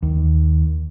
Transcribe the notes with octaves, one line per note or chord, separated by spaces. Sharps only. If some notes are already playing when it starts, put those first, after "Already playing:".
D#2